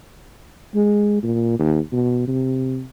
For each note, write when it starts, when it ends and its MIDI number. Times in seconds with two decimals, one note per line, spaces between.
0.75 1.22 56
1.23 1.56 46
1.59 1.79 39
1.92 2.23 47
2.27 2.84 48